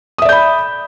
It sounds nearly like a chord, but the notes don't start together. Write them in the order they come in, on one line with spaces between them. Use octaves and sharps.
D#6 E5 D5 G6 B5